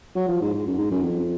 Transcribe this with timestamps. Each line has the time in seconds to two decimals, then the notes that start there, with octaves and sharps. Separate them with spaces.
0.16 F#3
0.28 F3
0.42 G#2
0.54 G#2
0.67 F#2
0.78 G#2
0.91 F#2
1.03 F2